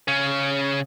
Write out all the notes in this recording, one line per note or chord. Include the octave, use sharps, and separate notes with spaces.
C#3 C#4